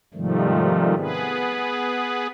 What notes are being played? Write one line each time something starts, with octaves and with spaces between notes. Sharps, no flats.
G#2 C3 D#3 F3 G3 A3
B3 G#4 B4